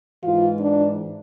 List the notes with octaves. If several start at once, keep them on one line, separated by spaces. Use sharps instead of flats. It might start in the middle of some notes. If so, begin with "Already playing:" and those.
G#2 E3 F4
D4